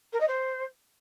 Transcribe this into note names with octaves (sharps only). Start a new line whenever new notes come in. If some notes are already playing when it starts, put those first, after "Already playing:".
A#4
D#5
C5